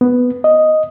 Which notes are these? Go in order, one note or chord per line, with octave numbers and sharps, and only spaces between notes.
B3
D#5